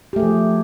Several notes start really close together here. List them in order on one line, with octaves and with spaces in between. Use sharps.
G4 A3 G#4 F3